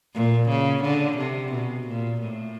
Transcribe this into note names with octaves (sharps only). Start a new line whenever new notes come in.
A#2
C#3
D3
C3
B2
A#2
A2